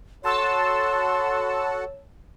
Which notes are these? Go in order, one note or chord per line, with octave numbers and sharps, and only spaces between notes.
F#4 A4 C#5 F#5 A5 C6 E6